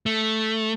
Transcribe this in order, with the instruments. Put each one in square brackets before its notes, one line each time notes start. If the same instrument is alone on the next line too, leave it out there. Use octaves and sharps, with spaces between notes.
[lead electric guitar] A3